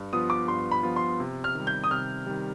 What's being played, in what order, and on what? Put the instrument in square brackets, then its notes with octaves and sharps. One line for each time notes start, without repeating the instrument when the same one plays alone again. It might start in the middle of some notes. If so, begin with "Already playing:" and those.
Already playing: [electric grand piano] G2
[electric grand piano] F3 B3 F4 [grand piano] D#6
[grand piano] D6
[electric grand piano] G2 [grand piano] C6
[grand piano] B5
[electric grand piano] F3 B3 F4
[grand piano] C6
[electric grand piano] C3
[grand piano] F6
[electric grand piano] D#3
G3
[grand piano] G6
D#6
[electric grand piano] C3 [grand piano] F6
[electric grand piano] D#3 G3